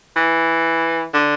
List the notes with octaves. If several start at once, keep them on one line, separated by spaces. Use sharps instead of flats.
E3
D3